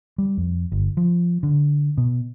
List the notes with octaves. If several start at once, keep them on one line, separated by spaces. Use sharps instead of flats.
G3
F2
G1
F3
D3
B2